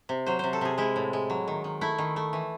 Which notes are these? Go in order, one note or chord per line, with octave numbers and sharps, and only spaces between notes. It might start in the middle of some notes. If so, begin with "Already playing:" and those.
C3
F#3 C5
C3 C5
A4
C3 G#4
G#3 E4
A2
G#3
F#3
D#3
D#3
A3 E4
D#3
A3
E3